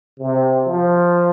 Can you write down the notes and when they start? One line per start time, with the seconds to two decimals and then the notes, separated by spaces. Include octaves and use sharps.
0.19 C3
0.66 F3